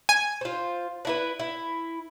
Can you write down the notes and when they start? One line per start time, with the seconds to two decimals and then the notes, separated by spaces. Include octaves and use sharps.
0.09 G#5
0.41 F4 C5
1.05 D4 E4 B4
1.40 E4